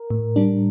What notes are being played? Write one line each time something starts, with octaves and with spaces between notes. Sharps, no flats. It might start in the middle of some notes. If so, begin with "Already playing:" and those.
Already playing: A#4
A2
G3 D4